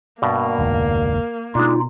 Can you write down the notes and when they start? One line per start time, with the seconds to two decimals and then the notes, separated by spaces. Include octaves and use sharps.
0.22 G2 B2 A#3
0.58 F1 D2 G#2
1.55 B2 G#3 D4 D#4 F4